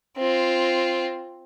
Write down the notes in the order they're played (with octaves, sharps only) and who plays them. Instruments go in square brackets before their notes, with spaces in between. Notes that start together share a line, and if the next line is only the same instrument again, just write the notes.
[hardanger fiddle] C4 F4